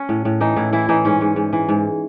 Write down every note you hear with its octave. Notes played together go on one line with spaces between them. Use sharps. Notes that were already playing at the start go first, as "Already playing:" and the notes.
Already playing: C#4
A2
A2
E3 D#4
A2 E4
E3 E4
E3 D#4
G#2 C#4
G#2
G#2
E3
G#2